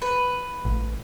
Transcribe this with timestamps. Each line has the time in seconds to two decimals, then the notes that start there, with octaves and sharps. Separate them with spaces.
0.02 B4
0.65 A1